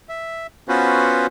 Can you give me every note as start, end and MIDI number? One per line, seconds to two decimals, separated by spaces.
0.09 0.47 76
0.68 1.27 59
0.68 1.27 61
0.68 1.27 65
0.68 1.27 66
0.68 1.27 71
0.68 1.27 72